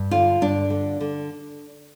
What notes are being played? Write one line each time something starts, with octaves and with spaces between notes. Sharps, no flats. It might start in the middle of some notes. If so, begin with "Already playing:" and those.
Already playing: G2
D3 F4
G2 D4
D3
D3